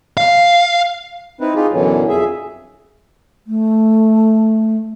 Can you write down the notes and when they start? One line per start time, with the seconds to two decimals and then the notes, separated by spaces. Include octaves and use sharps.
0.17 F5
1.41 C4 D#4 E4 B4
1.55 D#4 F4 G4 G#4
1.72 F#2 B2 D3 E3 F#3
2.09 F2 G#4 E5
3.47 A3